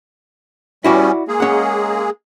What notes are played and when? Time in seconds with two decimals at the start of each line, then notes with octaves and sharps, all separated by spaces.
0.84 G3 B3 C#4 E4 F#4 D5
1.28 G#3 A#3 G#4
1.40 C#4 F#5